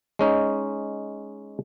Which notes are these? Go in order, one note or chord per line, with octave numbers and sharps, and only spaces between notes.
G#3 C#4 D#4